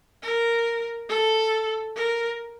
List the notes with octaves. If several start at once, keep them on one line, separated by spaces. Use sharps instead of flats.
A#4
A4
A#4